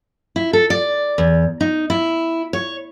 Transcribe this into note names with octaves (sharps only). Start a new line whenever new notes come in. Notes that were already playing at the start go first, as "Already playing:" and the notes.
E4
A4
D5
E2
D#4
E4
C#5